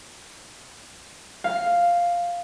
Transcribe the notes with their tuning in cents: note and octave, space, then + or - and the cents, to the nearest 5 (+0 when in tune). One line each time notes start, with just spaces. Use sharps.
F5 +0